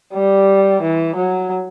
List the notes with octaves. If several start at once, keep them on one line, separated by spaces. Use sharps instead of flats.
G3
E3
F#3